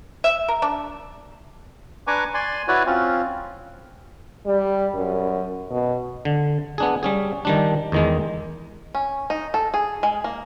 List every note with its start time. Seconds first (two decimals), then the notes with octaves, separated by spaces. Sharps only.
0.24 E5
0.48 A#4
0.62 D4
2.07 D4 B4 G#5 A#5 C#6 D6
2.34 D5 G#5 C6
2.68 E4 F#4 B4 C#5 D5
2.86 C4 C#4 F4
4.47 G3
4.94 F#2
5.71 B2
6.25 D3
6.78 B3 D4 G#4
7.03 G3 C#4 G#4
7.45 D#3 G3 D4
7.92 E2 D#3 G#3
8.95 C#4
9.30 D#4
9.54 A4
9.74 G#4
10.03 G#3
10.24 A#3